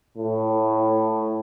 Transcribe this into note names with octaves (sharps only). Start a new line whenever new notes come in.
A2